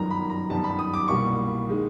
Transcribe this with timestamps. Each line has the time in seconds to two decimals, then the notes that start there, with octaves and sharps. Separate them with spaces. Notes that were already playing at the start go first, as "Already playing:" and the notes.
Already playing: G1 F#2 D#3 F#3 B3 A#5
0.11 B5
0.30 A#5
0.49 G1 F#2 D#3 G3 B3 A5
0.64 B5
0.79 D#6
0.94 D6
1.08 C2 B2 G3 A#3 C#6
1.69 D#3 G#3